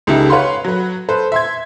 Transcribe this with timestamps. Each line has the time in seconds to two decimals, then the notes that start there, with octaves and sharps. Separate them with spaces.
0.07 C#2 C#3 D#4 G4 A4 E5
0.30 B4 C#5 F5 F#5 B5 C6
0.65 F#3 B4
1.09 A4 B4 C5
1.32 E5 C6 G#6